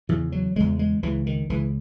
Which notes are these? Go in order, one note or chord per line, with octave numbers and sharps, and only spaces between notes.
E2 C#3 E3
F#3
E2 C#3 G#3
G#3
C#2 C#3 E3
D#3
C#2 C#3 E3